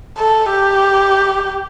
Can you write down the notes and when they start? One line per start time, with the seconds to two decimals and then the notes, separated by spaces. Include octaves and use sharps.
0.18 A4
0.50 G4